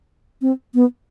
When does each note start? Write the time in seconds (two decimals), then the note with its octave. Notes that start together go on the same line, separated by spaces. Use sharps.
0.42 C4
0.75 B3